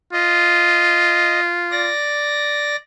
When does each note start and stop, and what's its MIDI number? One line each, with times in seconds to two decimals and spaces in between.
0.13 1.92 65
0.13 1.40 75
1.71 2.76 74
1.71 2.76 94